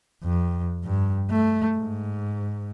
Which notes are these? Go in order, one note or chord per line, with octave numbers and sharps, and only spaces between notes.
F2
G2
A3
G#2